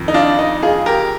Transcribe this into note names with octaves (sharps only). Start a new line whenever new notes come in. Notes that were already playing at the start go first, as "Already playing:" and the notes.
Already playing: F2 D#3
D#4
D4 F4
D#4
F4 G#4
G4 A#4